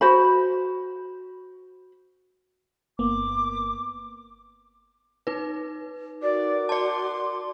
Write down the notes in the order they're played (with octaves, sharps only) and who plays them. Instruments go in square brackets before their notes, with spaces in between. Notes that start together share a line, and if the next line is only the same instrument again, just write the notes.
[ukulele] F#4 C5 B5
[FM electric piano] G1 A#3 B3 [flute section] D6
[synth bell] D#4 B4
[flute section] F#4 A#4 D6 [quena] D5
[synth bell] D5 A5 [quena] C6